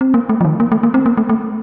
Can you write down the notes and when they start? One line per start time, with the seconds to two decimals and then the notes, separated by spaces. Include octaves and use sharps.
0.01 C4
0.14 A#3
0.29 A3
0.41 F3
0.45 D#3
0.60 A#3
0.72 A3
0.83 A#3
0.94 C4
1.06 A#3
1.17 A3
1.29 A3